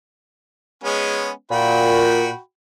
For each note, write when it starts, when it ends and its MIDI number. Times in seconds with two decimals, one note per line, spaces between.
0.84 1.30 56
0.84 1.30 59
0.84 1.30 61
1.51 2.29 46
1.51 2.39 66
1.51 2.39 79
1.51 2.39 83